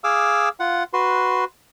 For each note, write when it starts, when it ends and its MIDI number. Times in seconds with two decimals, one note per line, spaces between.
0.04 0.49 68
0.04 0.49 77
0.04 0.49 86
0.04 0.49 88
0.60 0.83 65
0.60 0.83 78
0.93 1.44 66
0.93 1.44 71
0.93 1.44 84